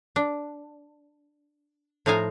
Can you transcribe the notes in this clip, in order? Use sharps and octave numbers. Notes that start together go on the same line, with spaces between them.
D4
A2 F3 D#4 F5 G#5 A#5